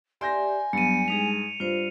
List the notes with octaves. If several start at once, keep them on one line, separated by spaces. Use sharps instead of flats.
G4 D5 E5 G#5 C6 G6 A#6
G2 F#3 B3 C#7 D#7
G#3 D#4 G#4 F7
G2 F4 C5